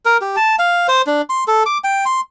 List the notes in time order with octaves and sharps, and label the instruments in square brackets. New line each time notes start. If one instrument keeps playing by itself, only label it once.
[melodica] A#4
G4
A5
F5
C5
D4
C6
A4
D6
G5
C6